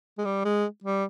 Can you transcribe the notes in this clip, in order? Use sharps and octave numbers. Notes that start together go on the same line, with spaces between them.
G#3
G3
G#3
G3